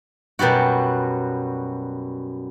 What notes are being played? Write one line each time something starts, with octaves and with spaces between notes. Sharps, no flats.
F#2 B2 F#3 G3 F#4